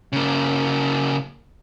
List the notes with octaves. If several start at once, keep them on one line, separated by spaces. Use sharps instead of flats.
C#3 A#3